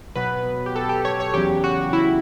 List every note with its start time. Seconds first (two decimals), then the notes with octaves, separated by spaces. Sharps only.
0.16 B2 F#3 B3 B4
0.66 G4
0.76 A4
0.89 G4
1.05 C#5
1.20 C#5
1.34 E2 C#3 F#3 G4
1.64 F#4
1.93 E4